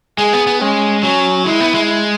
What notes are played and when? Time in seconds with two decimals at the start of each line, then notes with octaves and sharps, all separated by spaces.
0.18 G#3 G#4
0.33 B3
0.47 B3
0.61 G#3 C#4
1.03 F#3 C#4
1.46 G#3 E4
1.60 B3
1.74 G#3